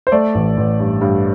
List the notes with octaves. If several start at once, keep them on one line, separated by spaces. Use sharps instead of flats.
C5
A3 D5
A1
A1
G2
G2